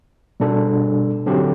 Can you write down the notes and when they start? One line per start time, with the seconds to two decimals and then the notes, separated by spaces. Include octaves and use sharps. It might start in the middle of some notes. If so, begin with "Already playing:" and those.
0.40 B2 G3 D4 A4
1.26 D3 F#3 C4 G4